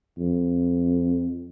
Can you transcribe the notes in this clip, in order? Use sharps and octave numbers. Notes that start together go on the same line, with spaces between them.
F2